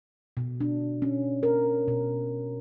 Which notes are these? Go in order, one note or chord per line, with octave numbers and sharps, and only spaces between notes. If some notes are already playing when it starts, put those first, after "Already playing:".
B2
D4
C#4
A#4
B2